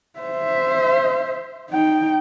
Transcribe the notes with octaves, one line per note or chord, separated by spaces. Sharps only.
C5 E5
D#4 G5